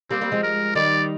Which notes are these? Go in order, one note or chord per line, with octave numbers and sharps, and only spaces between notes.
G3 A#3 C4
G3 A#3
F3 G#3
A#4
D#3 G3 D5